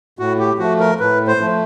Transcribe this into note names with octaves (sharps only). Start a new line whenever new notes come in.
A2 F#4
G4
F3 A3 F#4
A#4
A2 B4
C5
F3 A3